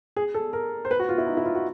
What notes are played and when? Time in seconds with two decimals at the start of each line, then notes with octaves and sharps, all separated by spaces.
0.16 G#4
0.34 A4
0.53 A#4
0.85 C5
0.91 B4
0.99 F#4
1.09 F4
1.18 E4
1.27 D#4
1.37 E4
1.45 F4
1.55 F#4